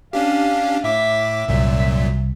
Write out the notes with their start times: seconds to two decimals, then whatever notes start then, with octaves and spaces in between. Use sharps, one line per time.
0.13 C#4 D4 G4 F5
0.84 A2 E5 D6
1.48 C2 F#2 A#2 F#3